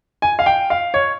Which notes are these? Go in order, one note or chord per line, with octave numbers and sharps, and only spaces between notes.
G#5
F5
G5
F5
C#5